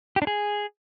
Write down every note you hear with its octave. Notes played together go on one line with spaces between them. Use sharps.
G4
D4
G#4